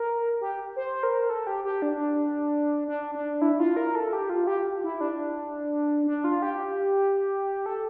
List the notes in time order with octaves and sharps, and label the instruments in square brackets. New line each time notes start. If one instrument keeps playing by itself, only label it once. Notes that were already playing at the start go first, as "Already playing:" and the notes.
Already playing: [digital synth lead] A#4
G4
C5
A#4
A4
G4
G4
D4
D4
D4
E4
F4
A#4
A4
G4
F4
G4
E4
D4
D4
F4
G4
A4